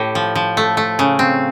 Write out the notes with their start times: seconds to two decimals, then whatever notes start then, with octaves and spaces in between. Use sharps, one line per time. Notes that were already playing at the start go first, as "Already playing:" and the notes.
Already playing: A2 G4
0.15 F3
0.35 F3
0.57 A3
0.77 A3
0.99 C#3
1.19 C4